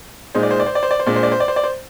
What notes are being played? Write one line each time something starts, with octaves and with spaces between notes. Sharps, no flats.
A#2 G#3 D#4 C5
D5
C5
D5
C5
D5
C5
D5
C5
A#2 G#3 D4 D5
C5
D5
C5
D5
C5
D5
C5